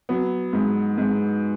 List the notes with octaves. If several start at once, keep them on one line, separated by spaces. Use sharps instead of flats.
F#3 B3
G#2
G#2